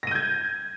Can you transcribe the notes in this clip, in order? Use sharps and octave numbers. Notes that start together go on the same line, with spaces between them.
G6 G#6 A#6 D#7